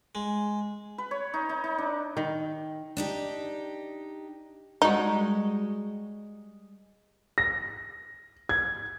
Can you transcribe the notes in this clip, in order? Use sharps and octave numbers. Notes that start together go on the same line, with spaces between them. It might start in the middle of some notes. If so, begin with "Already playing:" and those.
G#3
B4
C#5
D#4
D#4
D#4
D4
D#3
D4 D#4 G4
G3 G#3 D#4 F#4
A#6
G#6